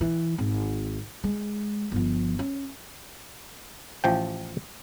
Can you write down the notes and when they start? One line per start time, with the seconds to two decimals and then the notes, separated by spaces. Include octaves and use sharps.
0.01 E3
0.38 G#1
1.24 G#3
1.92 G1 F3
2.39 C#4
4.04 A1 F3 G5